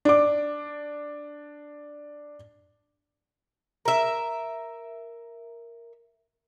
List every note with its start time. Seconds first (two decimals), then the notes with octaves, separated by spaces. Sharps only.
0.05 D4 D6
3.85 A#4 E5